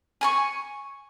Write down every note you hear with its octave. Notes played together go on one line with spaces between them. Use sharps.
G#5 A#5 C#6